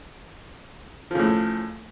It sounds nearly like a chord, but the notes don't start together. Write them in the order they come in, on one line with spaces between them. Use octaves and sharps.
F3 C#3 A2